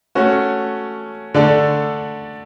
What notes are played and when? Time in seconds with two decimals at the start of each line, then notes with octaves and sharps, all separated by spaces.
0.15 A3 C#4 F#4
1.34 D3 A3 D4 A4 D5